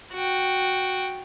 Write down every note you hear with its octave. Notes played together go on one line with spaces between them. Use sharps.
F#4 G5